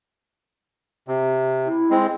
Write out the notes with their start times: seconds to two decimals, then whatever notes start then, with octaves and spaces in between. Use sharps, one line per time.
1.08 C3
1.66 E4
1.91 G#3 C4